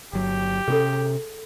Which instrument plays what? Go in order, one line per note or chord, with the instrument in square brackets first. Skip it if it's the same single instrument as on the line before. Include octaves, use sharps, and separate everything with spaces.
[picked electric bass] G1 F#3 [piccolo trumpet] G4
[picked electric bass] C3 C4 C#4 [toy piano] G#4 A4